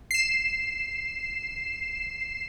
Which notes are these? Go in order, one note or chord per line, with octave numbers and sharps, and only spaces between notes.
C7 E7